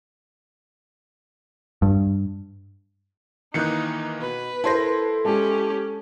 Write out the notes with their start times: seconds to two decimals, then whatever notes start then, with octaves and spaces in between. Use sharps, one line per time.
1.82 G2
3.54 D#3 E3 A#3 D#4 F#6 G6 C#7
4.21 B2 B4
4.64 E4 A4 A#4 C5 A5 C6 A#6
5.25 G#3 C#4 G4 A5